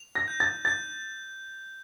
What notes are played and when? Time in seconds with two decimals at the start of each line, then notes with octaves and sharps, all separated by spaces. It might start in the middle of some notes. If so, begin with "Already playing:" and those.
Already playing: F7
0.15 A#6
0.28 G6
0.40 A6
0.65 G6 A6